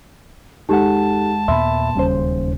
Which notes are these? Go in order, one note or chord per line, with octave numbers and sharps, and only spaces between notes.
D#2 G#3 D#4 G4 A4 F#5 A5
D#2 A#2 B3 E5 B5 C6
E1 D#2 C#3 G3 C#4 C5